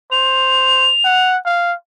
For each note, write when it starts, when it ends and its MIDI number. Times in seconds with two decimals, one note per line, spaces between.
0.12 0.90 72
0.12 1.29 101
1.05 1.37 78
1.45 1.74 77